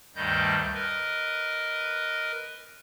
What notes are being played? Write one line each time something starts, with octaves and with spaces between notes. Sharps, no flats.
D2 G2 D#3 G3 D#5 G6
A#4 B4 D#5